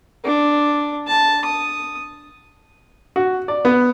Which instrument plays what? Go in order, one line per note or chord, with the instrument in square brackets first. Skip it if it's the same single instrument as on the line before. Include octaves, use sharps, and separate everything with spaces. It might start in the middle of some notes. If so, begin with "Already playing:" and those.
[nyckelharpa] D4
A5
D#6
[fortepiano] F#4
D5
B3